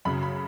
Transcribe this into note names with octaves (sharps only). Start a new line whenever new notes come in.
F#2 C#3 F#3 B5
B5